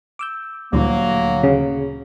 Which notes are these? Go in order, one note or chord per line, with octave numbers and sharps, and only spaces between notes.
D6 E6 G6
D2 A#2 E3 F#3 G3 A#3
C#3